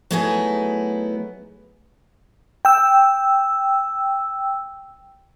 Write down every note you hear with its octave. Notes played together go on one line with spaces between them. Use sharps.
F#3 A3 B3 D#4 E4 G#4
G5 E6